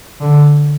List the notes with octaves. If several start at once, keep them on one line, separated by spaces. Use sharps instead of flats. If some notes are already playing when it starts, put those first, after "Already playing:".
D3